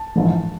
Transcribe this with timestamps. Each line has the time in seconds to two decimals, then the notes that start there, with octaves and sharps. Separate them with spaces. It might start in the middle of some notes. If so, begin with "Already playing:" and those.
Already playing: A5
0.16 A#1 G#2 E3